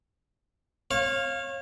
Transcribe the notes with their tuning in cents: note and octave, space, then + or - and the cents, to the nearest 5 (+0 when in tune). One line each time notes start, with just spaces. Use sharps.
C#5 -30 F5 +0